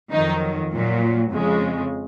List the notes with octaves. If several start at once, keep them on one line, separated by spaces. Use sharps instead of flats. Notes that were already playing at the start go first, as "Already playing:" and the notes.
F2 D#3 F#3 D#4
A#2 F#3
F2 C#3 G#3